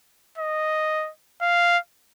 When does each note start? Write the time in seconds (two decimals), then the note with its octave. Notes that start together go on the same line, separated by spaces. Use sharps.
0.38 D#5
1.41 F5